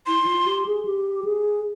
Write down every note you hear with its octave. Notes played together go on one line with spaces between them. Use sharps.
E4 C6
E4
F4
G4
G#4
G4
G#4